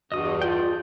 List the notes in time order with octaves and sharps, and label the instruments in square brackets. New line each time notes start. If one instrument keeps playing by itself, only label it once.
[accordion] E2 G2 [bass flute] F#4 [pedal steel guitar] D#5 D#6
[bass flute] F4 [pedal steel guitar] D5 G5